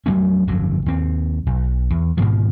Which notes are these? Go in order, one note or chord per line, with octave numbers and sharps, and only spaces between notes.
F2 F#3 A3 C#4
G1 F2 D3 F#3
D#2 C4
B1
E2
G#2 B2 D#3 F3